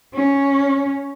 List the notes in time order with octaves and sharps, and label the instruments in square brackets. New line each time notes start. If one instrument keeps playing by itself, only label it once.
[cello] C#4